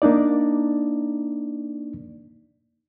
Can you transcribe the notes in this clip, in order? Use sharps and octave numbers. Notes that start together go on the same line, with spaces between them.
A#3 D4 D#4 D5